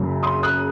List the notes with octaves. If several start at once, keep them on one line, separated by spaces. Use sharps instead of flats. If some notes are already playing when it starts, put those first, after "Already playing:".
Already playing: F#1 F#2 C#3 F#3
C6 D#6
D#6 F#6